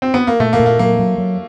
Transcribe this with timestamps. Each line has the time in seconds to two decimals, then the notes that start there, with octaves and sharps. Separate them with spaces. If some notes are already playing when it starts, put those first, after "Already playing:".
0.02 C4
0.14 B3
0.27 A#3
0.40 A#2 A3
0.53 A#3
0.60 A#2
0.66 A#3
0.79 F#3 A#3
0.99 F#3
1.18 F#3